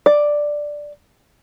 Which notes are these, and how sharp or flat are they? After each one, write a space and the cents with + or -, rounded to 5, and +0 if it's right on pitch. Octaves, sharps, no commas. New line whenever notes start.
D5 +5